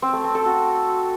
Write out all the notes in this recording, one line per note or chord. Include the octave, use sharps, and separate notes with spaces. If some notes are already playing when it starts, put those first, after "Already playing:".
C4
A3
C4
A4
F#4